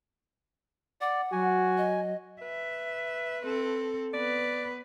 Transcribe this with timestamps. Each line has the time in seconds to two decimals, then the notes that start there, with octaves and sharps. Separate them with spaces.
1.01 D5 F#5
1.32 F#3 F#4 G#5
1.78 D#5
2.42 B4 E5
3.42 C4 A4
4.13 B3 B4 D5